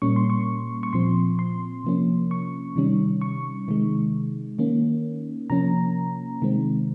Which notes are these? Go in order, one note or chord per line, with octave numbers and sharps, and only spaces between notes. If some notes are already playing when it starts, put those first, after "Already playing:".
A#2 G3 A#3 C#4 C#6
C6
C#6
C#6
A#2 F3 C4 C6
C6
C3 F3 A#3 C#4
C#6
C3 D#3 G3 C#4
C#6
C3 D#3 G#3
D#3 A#3 C#4
C3 F3 A#3 C#4 A#5
C3 D#3 G#3 C4